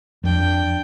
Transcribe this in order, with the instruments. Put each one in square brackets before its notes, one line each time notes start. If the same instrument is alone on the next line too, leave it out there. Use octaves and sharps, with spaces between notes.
[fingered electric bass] F2 [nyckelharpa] D4 G5